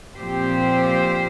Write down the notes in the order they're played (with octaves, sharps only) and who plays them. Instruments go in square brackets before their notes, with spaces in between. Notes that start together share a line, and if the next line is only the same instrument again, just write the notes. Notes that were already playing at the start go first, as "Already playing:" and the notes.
[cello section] A#2 F3 C4 G4 C5